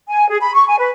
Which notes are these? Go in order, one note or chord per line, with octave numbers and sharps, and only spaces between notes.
G#5
G#4
B5
C#6
G#5
B4